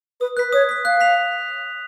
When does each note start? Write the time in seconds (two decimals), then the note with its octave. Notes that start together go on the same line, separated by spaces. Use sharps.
0.21 B4 D#6
0.37 B4 F#6 B6
0.53 C#5 D#6
0.69 F#6 B6
0.85 F5 F#6
1.01 B6 F7